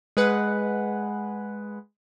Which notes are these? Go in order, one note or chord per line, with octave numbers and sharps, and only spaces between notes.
G#3 G#4 B4 F#5